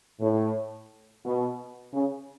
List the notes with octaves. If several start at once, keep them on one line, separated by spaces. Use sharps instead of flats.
A2
B2
C#3